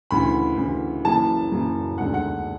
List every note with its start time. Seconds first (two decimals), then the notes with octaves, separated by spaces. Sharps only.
0.11 D2 C#3 E3 B5
0.57 D2 C#3 E3
1.04 F#1 F#2 C#3 E3 A5
1.51 F#1 F#2 C#3 E3
1.98 E1 D2 D3 F#5
2.14 F#5